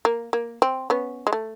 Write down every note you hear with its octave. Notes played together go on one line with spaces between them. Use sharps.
A#3
A#3
C4
B3 C#4
G#3
A3